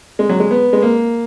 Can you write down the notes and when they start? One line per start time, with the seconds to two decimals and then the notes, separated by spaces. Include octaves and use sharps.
0.19 G#3
0.29 F#3
0.40 G#3
0.51 B3
0.73 G#3
0.82 A#3